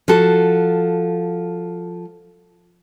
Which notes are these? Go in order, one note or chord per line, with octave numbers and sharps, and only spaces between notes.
F3 F#4 A4